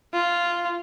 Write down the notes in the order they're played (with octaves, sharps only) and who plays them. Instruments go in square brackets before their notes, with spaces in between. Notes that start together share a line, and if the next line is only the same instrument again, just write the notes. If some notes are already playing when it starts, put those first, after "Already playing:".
[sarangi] F4